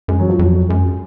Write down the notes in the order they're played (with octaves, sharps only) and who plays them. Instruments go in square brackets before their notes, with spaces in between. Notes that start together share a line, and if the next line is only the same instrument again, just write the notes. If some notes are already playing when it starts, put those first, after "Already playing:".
[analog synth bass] F#2 [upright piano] G#3
[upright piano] F#3
F3
[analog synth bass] F2 [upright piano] F#3
[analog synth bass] F#2 [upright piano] G#3